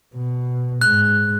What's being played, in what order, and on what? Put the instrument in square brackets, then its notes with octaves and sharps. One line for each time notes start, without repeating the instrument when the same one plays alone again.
[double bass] B2
[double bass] G#2 G#3 [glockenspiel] F#6